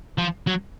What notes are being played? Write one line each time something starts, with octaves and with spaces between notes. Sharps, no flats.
F3
F#3